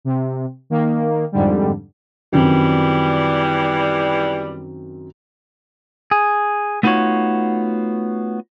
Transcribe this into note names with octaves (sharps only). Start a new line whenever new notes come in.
C3
D#3 A#3
F2 G#2 D3 G3
F#2 D#3 E3 G3 C4
G#4
A3 B3 D#4 F4 F#4 C#5